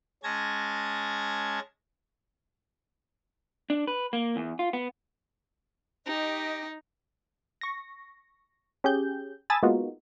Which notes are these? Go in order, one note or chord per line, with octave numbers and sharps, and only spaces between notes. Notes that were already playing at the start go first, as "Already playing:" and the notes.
G#3 C#4 A5 G#6 A#6
D4
B4
A#3
E2
F4
B3
D#4 G4 D#5
C#6 A#6
C#4 G4 G#4 G6
G#5 A5 B5 D#6 E6 A6
G#3 A#3 B3 D#4 F4 F#4